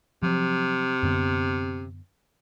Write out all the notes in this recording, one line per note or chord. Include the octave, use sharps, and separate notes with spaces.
C3 F3 F#3
F#2 D3 B3